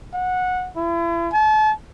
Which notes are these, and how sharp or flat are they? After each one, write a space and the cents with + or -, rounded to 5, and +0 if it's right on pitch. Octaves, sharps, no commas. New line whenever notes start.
F#5 -15
E4 +40
A5 -35